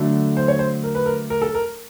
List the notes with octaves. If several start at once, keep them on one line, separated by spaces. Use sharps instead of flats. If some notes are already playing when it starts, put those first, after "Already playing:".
Already playing: D3 F#3 A3
C5
C#5
C5
A#4
B4
A#4
A#4
A4
A#4